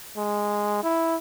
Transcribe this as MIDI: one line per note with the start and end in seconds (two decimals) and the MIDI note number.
0.17 0.78 56
0.83 1.16 64